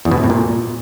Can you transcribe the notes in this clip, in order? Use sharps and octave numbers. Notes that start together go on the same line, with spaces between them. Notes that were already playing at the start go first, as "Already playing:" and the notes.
E2
B2
C3
A2
A#2